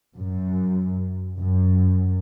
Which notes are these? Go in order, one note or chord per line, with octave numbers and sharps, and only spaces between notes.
F#2
F#2